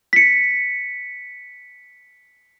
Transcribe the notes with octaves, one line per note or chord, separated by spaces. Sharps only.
B6 C#7